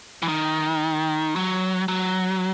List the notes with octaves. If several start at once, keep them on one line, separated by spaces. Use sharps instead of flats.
E3
D#3
F#3
F#3